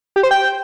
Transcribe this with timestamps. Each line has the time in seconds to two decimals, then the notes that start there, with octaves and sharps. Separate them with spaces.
0.16 G4
0.23 C5
0.31 G5